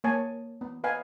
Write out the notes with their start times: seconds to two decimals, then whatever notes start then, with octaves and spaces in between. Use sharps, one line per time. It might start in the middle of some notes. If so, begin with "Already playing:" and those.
0.04 A#3 C#5 G#5 A5
0.61 B3
0.84 B4 D#5 F5 F#5 G#5